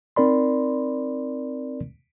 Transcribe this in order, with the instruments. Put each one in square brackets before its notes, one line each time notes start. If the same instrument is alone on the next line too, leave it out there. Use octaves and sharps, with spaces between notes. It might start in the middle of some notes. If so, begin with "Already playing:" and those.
[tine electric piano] C4 D#4 A#4 D5 B5 C6